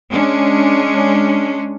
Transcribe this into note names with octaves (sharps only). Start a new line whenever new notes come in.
G#3 C#4 D4